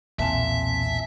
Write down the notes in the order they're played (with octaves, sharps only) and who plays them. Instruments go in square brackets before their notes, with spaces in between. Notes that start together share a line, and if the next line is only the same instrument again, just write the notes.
[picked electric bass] B1 E2 A#2 [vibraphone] C4 G#5 A5 [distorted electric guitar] E5